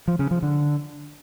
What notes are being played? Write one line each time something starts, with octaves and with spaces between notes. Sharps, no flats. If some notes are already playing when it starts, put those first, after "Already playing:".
F3
C#3
F3
D3